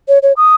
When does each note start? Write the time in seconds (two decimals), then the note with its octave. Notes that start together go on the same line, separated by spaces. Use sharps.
0.08 C#5
0.23 C#5
0.37 D#6